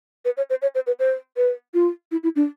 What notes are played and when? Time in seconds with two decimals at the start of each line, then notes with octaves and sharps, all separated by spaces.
0.25 B4
0.37 C#5
0.50 C5
0.62 C#5
0.75 C5
0.87 B4
0.99 C5
1.37 B4
1.74 F4
2.11 E4
2.23 E4
2.36 D4